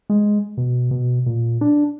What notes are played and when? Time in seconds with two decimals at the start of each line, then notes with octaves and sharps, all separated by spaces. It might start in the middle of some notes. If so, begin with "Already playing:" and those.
0.10 G#3
0.57 B2
0.91 B2
1.26 A#2
1.61 D4